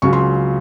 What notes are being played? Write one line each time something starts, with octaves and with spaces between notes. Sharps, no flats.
C#2 C#3 F#3 C#6
C6